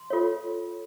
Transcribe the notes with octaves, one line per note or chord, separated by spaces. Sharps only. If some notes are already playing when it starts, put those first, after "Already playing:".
Already playing: C6
F4 A4 C#5